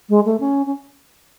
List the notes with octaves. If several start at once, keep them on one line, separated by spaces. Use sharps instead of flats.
G#3
A3
C#4
C#4